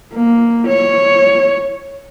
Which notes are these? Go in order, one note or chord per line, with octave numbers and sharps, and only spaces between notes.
A#3
C#5